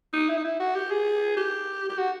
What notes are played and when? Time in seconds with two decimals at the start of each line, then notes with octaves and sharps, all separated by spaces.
0.13 D#4
0.29 E4
0.37 D#4
0.44 E4
0.60 F#4
0.75 G4
0.91 G#4
1.37 G4
1.89 G4
1.98 F#4